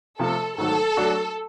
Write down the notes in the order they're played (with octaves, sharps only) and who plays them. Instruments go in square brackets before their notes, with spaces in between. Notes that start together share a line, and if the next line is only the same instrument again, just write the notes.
[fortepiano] C3 F3 A3 [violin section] A4
[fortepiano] G#2 D#3 F#3 A3 [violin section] A4
[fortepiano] F#3 A3 D4 F#4